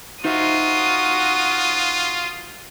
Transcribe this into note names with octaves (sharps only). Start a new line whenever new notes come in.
D#4 F4 F#4 C5 E5 D#6